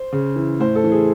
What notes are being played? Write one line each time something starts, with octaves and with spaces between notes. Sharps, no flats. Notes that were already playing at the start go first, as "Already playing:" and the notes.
Already playing: C5
C#3
E3
A2 C5
A4
E3
G#4